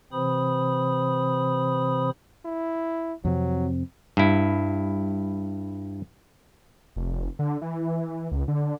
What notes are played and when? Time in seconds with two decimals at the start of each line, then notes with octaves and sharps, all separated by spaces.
0.12 C3 E3 C4 C5 B5 D#6
2.45 E4
3.25 F2 C3 F#3 C4
4.17 G2 E4
6.96 F1
7.39 D3
7.62 E3
8.31 C#2
8.48 D3